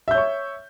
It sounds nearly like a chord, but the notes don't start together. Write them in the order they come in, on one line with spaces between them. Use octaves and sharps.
E5 G6 C#5 C#6